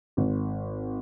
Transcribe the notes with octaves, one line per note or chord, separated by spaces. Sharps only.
G#1